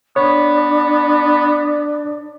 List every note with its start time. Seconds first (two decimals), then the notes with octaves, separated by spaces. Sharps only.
0.16 B3 D4 C#5